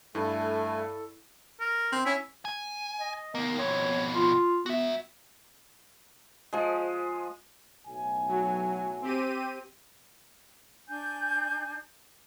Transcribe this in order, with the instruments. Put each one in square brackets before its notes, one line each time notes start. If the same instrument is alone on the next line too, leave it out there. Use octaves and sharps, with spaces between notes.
[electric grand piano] G2 [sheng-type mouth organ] A3 G#5 [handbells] E4 [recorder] A4
[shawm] A#4
[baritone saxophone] C4
[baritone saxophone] C#4 [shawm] E4
[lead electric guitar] G#5
[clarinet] D#5
[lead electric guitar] D#2 A#3 [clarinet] B3
[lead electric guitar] F2 B2 [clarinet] C#5
[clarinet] F4
[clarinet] B3 [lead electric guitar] F#4 E5
[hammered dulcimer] F3 G#3
[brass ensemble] B1 A2 G#5
[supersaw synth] F#3
C4 G4 D#7
[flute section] D4 G#5 G6